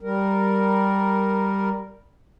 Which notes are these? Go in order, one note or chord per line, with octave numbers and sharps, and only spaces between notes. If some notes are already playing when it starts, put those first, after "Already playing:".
G3 A#4